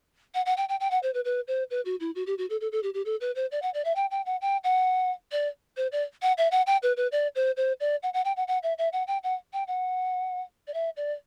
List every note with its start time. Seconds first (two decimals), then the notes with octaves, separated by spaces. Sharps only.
0.34 F#5
0.46 F#5
0.57 G5
0.69 G5
0.80 G5
0.91 F#5
1.03 C5
1.14 B4
1.25 B4
1.48 C5
1.71 B4
1.85 F#4
2.00 E4
2.15 F#4
2.27 G4
2.38 F#4
2.50 A4
2.61 A4
2.72 A4
2.83 G4
2.94 G4
3.05 A4
3.21 B4
3.36 C5
3.52 D5
3.62 F#5
3.74 D5
3.85 E5
3.96 G5
4.11 G5
4.26 F#5
4.42 G5
4.64 F#5
5.32 D5
5.77 C5
5.92 D5
6.22 F#5
6.38 E5
6.52 F#5
6.67 G5
6.83 B4
6.97 B4
7.12 D5
7.36 C5
7.57 C5
7.80 D5
8.03 F#5
8.14 F#5
8.25 G5
8.37 F#5
8.48 F#5
8.63 E5
8.78 E5
8.93 F#5
9.07 G5
9.24 F#5
9.53 G5
9.68 F#5
10.67 D5
10.74 E5
10.97 D5